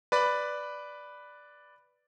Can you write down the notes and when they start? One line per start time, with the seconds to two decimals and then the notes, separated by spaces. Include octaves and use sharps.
0.12 B4 D5 B5